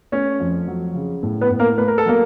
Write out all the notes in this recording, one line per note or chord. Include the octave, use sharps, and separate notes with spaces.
A3 C#4 C#5
F2
F#3
C#3
A2
B3 B4
A2
A#3 A#4
A3 B4
A#4
A4
F#3 A#3 A#4